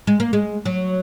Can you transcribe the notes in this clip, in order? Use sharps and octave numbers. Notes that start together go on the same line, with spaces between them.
G#3
A#3
G#3
F#3